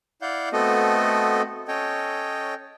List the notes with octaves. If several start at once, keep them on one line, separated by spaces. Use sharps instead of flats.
E4 D5 F5 F#5 G6
A3 B3 C4 F#4 A4 D#5
C#4 A4 C#5 D#5 G5